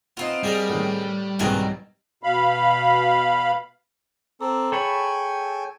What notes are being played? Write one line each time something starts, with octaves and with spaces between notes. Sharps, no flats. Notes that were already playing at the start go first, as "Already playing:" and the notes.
B3 C4 D#4 F4
G3 G#4 A#4 D5
A2 D#3
C2 G#2 B2 D#3 E3 F#3 G#4
B2 F5 B5
C4 A4 A#5 D6
G#4 A4 C#5 G5 G#5 B5